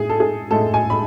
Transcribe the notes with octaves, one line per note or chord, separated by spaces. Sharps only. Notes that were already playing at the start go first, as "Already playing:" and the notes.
Already playing: A2 G#4
A4
G#4
A2 G#3 A4
G#5
B5